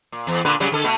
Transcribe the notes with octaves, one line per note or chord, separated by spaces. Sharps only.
A#2
E2
A#2 D3 B4
C#3 F#3 G3
D3 A4
B2 A3 B3